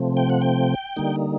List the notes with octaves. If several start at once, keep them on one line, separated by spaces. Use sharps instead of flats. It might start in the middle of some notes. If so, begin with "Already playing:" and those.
Already playing: C3 F3 A3 C4
G5
F#5
G5
D3 G3 A#3 D#4